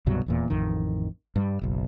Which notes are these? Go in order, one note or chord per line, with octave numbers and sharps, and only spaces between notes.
C2 G2 B2 F#3
D#1 E2 A#2
A1 F2 D#3
G2 G3
F#1 B1